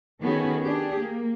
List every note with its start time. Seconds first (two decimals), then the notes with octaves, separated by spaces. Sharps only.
0.22 D#3 B3 C#4 F#4 G#4 A4
0.61 D4 G4 G#4
1.00 A#3